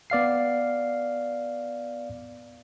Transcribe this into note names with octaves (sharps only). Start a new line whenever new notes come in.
B3 D5 F5 C7